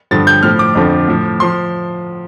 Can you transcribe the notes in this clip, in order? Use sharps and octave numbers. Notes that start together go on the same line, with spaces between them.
G2 D3 F3 A6
G6
A2 F3 F6
D6
F2 D3 F3
A2 F3
F3 C6